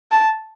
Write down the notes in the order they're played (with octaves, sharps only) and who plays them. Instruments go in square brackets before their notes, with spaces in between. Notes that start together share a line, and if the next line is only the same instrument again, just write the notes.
[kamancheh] A5